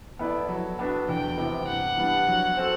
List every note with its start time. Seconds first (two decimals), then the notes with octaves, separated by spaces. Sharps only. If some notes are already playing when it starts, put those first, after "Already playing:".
0.19 B3 E4 A4 B4 D5
0.49 F#3
0.79 B3 D4 F#4 B4
1.09 E2 G5
1.38 C3 E3 B3
1.67 G2 F#5
1.97 E3 G3 B3 D4
2.27 F#3
2.57 C4 F#4 A4